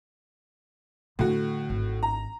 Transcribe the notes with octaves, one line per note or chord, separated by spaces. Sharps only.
A2 D3 E4 F#4
G#1
A#5